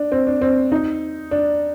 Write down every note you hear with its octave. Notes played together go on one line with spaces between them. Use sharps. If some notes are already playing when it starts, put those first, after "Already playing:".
Already playing: D4
C4
D4
C4
D#4
D4